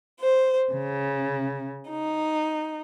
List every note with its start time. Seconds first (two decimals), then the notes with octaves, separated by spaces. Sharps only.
0.20 C5
0.73 C#3
1.90 D#4